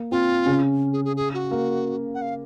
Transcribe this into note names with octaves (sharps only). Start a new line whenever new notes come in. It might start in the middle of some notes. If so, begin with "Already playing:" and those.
Already playing: A#3
C4 F4
C#3 C#4
G#4
G#4
G#4
F#4
A#3 A#4
F#5
F5